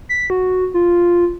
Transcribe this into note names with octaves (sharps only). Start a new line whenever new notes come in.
B6
F#4
F4